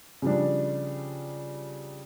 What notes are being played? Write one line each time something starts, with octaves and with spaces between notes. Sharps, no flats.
C#3 F3 G3 D4